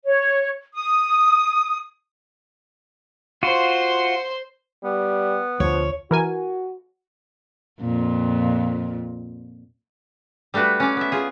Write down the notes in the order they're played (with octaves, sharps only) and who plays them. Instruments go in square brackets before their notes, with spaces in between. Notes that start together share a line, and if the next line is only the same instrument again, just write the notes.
[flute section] C#5
D#6
[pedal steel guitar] F4 F#4 [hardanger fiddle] C5 C6
[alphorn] G3 [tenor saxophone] B3
[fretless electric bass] D2 [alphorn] F3 [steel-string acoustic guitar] C#5
[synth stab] E3 A#4 G#5 [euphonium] F#4
[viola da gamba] F2 A#2
[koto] G3 A3 D4 F#4 B4
C#4 D5
B3 E5
F4 G#4